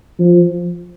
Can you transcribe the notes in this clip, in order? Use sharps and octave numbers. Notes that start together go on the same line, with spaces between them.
F3